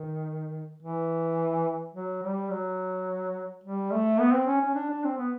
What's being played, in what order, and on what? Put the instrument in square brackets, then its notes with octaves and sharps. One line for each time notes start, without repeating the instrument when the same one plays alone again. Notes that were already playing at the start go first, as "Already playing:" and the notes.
Already playing: [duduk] D#3
E3
F#3
G3
F#3
G3
A3
B3
C4
C#4
C#4
D4
D4
C4
B3